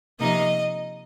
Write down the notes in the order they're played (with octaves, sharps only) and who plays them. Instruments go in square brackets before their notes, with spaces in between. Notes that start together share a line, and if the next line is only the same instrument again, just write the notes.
[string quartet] C3 F3 A#3 D#4 D#5